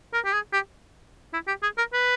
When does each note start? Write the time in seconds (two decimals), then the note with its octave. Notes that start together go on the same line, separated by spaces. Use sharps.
0.14 A#4
0.25 G4
0.33 G#4
0.53 G4
1.33 E4
1.48 G4
1.63 G#4
1.78 A#4
1.93 B4